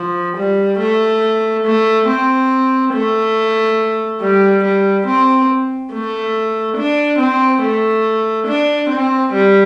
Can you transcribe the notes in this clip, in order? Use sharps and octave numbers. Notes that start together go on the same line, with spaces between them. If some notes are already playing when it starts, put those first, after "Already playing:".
Already playing: F3
G3
A3
A3
C4
A3
G3
G3
C4
A3
D4
C4
A3
D4
C4
G3